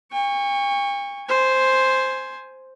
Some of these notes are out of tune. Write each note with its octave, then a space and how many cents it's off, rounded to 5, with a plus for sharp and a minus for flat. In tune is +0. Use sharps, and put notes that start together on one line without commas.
G5 +45 C#6 +0
C5 +0 G#5 +10